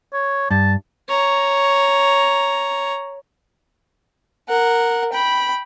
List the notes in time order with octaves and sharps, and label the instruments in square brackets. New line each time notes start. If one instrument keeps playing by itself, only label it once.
[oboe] C#5
[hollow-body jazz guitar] G2 [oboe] A5
[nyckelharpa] C#5 A#5
[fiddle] A#4 F#5
G5 B5